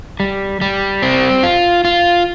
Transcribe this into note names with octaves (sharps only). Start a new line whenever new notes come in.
G3
G3
C4
F4
F4